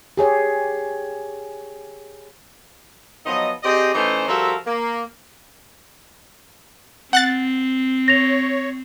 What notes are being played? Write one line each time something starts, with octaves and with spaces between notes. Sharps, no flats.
G4 G#4 C#5
F3 F#3 B3 D#4 D#5
C4 G4 G#4 D5 D#5
E3 A3 C#4 D#4 C5
F3 G3 F#4 A4 A#4 E5
A#3
C4 F#5 F#6 A6
C#5 A#6 F7